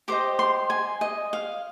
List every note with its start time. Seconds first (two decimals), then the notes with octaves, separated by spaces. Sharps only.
0.08 G4 C5 D#5 D6
0.39 C6
0.70 G#5
1.01 D#5
1.33 F5